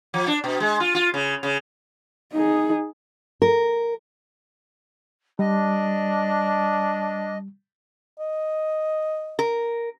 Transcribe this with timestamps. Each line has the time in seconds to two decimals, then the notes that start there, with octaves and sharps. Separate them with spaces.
0.14 F3
0.27 D4
0.44 B2
0.60 G#3
0.80 F4
0.95 F4
1.14 C#3
1.43 C#3
2.33 D#4 G#4
3.42 A#4
5.39 G3 D4 D#5
8.19 D#5
9.39 A#4